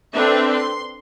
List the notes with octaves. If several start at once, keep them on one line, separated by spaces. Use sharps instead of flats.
C4 D4 A4 B4 E5
C6